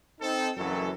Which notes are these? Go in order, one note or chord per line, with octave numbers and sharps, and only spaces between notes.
C4 D#4 A4
F#1 F#2 E3 F#3 A4